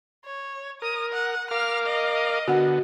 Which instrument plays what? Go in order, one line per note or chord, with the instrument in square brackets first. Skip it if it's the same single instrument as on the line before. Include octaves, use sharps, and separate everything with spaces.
[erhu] C#5
[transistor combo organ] A#4 [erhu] D#6
[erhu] F#5
[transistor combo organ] A#4 F5 D6 [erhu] F6
[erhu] D#5
[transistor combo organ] D3 B3 [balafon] F#4 F#5